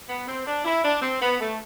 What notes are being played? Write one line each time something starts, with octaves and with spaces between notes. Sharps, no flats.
B3
C4
D4
E4
D4
C4
B3
A3